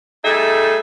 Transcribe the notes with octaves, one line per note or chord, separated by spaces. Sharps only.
G3 A3 D#4 G#4 A4 E5